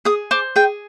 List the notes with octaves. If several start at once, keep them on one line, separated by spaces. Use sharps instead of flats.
G#4 D#6
C5 D6
G#4 G5